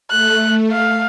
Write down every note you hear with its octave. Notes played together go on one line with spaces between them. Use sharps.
A3 F#6
F5